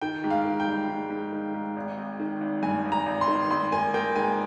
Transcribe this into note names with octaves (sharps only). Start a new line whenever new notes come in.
D#3 G5
G#2
F5
D#3
G5
G3
G#2
G#2
D#3
G#2
G#1
G#1
D#3
G#1
G2 G#5
G#1
A#5
G#1
C6
D#3
G#1 C6
A#3 G#5
A#3 G5
G#2 G#5